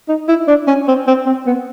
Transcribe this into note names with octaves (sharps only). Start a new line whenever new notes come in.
D#4
E4
D4
C#4
C4
C4
C4
B3